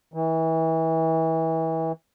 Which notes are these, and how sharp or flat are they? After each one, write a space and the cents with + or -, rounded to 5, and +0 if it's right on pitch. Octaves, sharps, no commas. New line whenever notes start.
E3 -30